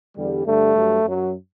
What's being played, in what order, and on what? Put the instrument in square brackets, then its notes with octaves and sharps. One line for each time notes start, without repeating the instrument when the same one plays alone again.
[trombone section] E2 D3 G3
G2 D3 G3 A3
G2 F#3
F#2 F#3